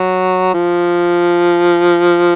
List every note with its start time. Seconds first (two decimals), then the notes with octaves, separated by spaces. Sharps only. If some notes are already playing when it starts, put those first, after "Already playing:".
Already playing: F#3
0.54 F3